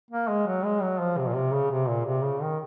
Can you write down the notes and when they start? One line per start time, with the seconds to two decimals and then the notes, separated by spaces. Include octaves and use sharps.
0.11 A#3
0.29 G#3
0.47 F#3
0.64 G#3
0.82 F#3
1.00 F3
1.18 C3
1.28 A#2
1.35 C3
1.53 C#3
1.71 C3
1.88 A#2
2.06 C3
2.24 C#3
2.42 D#3